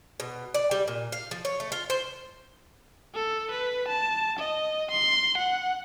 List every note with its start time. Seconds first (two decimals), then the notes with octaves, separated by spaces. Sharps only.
0.20 B2
0.54 D5
0.71 G3
0.88 A#2
1.12 F5
1.31 F3
1.45 C#5
1.60 A3
1.72 F4
1.90 C5
3.14 A4
3.51 B4
3.88 A5
4.39 D#5
4.91 C6
5.38 F#5